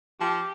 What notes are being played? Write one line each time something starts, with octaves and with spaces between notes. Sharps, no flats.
F3 G4